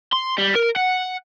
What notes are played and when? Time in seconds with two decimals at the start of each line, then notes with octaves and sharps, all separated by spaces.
0.13 C6
0.38 G3
0.55 A#4
0.76 F#5